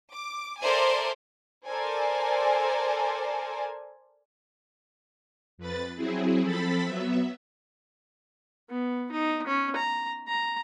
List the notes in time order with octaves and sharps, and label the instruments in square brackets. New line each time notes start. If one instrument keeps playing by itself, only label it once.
[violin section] D6
A4 A#4 C5 D5 E5 G#5
A4 A#4 C5 D5 G#5
[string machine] F2 B4 A6
F#3 C4 E4 G#4
F3 C4 A4 B5 A6 B6
F#3 B3 E5
[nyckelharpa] B3
D#4
C#4
A#5
A#5